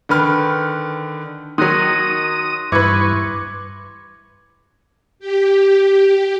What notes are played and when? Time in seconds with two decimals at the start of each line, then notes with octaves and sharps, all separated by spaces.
0.09 D3 D#3 B4 F6
1.58 D#3 F#3 C6 D#6 F#6 A#6
2.72 G2 E3 B4 C#6 D6 G#6
5.19 G4